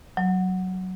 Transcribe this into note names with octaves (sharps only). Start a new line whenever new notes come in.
F#3